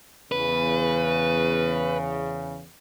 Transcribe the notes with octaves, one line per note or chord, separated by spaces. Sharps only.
E2 C#3 B4